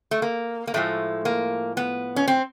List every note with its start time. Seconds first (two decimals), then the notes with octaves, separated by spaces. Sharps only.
0.11 A3
0.22 A#3
0.67 A#3
0.74 A2 F3 G#3 A3
1.25 A#3
1.77 B3
2.16 C#4
2.28 C4